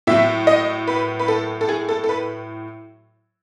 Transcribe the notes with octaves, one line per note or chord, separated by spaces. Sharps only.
A2 F#3 E5
D#5
B4
B4
A4
A4
G#4
A4
A4
B4